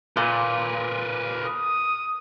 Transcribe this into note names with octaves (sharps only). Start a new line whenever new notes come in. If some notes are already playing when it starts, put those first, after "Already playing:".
A#2 A#4 B4
D#6